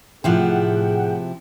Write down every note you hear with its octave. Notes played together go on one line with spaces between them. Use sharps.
A2 C3 F3 E4 G#4 F#5 G5